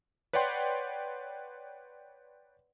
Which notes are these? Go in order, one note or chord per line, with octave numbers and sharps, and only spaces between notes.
B4 C#5 D5 F#5 G5 C6